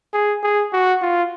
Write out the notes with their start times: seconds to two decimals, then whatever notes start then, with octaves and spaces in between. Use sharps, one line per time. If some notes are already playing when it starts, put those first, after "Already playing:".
0.13 G#4
0.43 G#4
0.73 F#4
1.02 F4